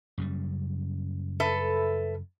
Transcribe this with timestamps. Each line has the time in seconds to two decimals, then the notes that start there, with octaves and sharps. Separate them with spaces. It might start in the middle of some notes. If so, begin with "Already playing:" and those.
0.18 F#2 C#3 G3
1.40 A4 B4 E5